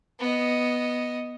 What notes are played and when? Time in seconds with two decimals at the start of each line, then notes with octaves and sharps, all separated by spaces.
0.20 B3 D#5